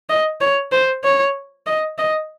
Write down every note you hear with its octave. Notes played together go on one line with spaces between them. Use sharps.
D#5
C#5
C5
C#5
D#5
D#5